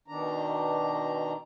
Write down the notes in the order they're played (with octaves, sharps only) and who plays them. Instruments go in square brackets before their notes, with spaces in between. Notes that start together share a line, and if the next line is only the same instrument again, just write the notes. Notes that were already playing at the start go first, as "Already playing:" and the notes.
[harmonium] B2 D#3 D4 A#5